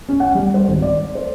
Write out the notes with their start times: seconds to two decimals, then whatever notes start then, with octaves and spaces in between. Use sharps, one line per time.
0.09 C#4
0.20 F#5
0.35 G3
0.54 C5
0.68 G#1
0.82 D5
1.15 C5